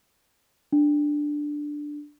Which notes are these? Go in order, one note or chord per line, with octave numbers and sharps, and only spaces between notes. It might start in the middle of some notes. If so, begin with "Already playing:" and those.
D4